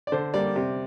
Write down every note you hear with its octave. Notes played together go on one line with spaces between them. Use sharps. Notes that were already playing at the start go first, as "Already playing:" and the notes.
D5
D3 C5
G3 A#3 D5
C3